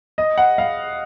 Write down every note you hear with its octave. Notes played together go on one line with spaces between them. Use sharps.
D#5
F#5
F5